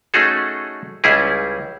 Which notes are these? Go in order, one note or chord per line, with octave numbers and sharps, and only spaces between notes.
A3 C#4 D#4 F#4 G#4 A4
C#2 G3 C#4 E4 G#4